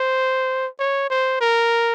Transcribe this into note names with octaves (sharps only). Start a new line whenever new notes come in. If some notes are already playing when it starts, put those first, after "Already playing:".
Already playing: C5
C#5
C5
A#4